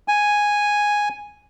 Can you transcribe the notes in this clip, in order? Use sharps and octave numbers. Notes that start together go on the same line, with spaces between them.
G#5